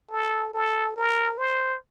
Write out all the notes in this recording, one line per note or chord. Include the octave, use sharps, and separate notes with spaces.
A4
A4
A#4
C5